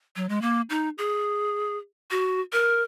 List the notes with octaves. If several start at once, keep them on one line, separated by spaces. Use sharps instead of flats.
F#3
G#3
A#3
D#4
G#4
F#4
A#4